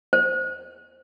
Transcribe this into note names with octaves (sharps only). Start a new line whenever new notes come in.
C5